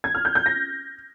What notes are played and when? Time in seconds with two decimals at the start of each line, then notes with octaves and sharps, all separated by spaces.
0.04 G#6
0.14 F6
0.25 G6
0.35 G6
0.46 A#6